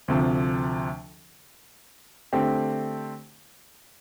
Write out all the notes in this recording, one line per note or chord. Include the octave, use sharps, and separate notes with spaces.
D2 C3 F3
D3 A3 C4 G4